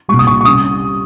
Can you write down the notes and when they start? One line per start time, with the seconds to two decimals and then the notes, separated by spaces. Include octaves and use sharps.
0.08 C2 A#2 G3 C#6
0.19 D#6
0.27 C#6
0.41 C#6
0.45 C3 G3 C#4 D#6